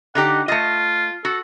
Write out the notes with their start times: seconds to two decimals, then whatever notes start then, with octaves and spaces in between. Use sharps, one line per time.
0.15 D3 D#4 G4 F#5
0.48 A3 F4 D#5
1.25 F#4 A4